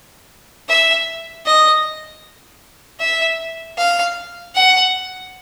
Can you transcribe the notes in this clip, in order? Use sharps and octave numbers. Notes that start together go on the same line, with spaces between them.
E5
D#5
E5
F5
F#5